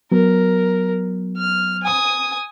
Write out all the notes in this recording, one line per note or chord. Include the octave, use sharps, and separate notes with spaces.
F#3 B3 A#4
F6
G#5 D#6